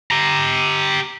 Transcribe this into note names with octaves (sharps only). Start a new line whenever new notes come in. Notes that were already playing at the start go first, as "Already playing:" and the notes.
G4 A#5